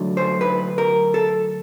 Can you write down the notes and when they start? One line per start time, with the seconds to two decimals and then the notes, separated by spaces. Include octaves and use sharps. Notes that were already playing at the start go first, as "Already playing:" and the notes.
Already playing: D2 D3 F#3 A3
0.17 C5
0.41 B4
0.78 A#4
1.14 A4